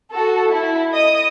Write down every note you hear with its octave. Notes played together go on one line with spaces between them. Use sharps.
F#4 A4
E4
D#5 D#6